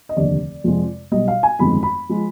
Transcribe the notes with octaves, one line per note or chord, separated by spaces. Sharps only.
D#5
F1 D#2 D3 D5
F2 C3 F3 G#3
B1 B2 G3 D#5
F5
G#5
G1 F2 D#3 G#3 B5
B5
F3 G#3